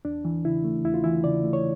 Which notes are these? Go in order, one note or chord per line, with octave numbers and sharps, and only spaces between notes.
E2 D4
E3
C#3 E4
A3
E2 E4
F4
E3 E4
C#3 D5
A3
C#5